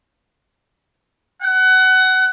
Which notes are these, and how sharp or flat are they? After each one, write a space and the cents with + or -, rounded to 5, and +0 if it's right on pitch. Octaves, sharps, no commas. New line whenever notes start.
F#5 +20